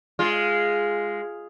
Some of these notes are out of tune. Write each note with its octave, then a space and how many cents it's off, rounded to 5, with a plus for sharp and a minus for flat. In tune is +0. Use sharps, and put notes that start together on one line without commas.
G#3 +0 F4 +0